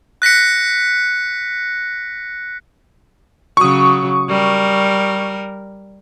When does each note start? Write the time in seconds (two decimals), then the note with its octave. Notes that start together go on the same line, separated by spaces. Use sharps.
0.22 F#6 A#6 B6 C#7
3.57 C#3 F#3 C#6 D#6
4.29 G3 A#4